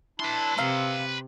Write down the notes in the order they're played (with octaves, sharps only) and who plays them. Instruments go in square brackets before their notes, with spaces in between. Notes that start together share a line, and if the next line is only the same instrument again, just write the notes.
[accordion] D4 E4 A5 [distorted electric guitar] B4 C6
[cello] C3 [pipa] A#4 F5 [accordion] E6